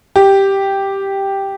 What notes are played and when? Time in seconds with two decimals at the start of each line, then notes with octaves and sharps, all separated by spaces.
0.16 G4